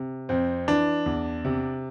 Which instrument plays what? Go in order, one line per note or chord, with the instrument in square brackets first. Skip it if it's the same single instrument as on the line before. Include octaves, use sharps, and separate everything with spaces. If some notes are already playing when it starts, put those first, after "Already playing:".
Already playing: [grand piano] C3
F2 C4
E3 D4
E2
C3